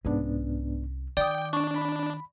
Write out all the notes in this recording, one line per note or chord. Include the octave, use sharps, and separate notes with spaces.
C2 G#2 B3 C#4 D4
D#3 D5 G5 D6 D#6
D4 C#6
B5